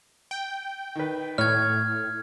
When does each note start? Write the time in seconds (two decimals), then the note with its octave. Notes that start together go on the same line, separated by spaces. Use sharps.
0.31 G5
0.95 D#3 B4
1.38 A2 C#5 F6 G#6